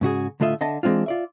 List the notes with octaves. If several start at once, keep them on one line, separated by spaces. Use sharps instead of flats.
G#2 C#3 F#4 G#4
A2 D3 A3 F4 D#5 E5
D3 D#5 E5 A5
E3 G#3 C4 D4 F4
F4 D5 E5